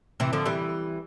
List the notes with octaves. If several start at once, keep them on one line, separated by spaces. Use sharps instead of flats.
C3 E3
D3 F3
E3 G3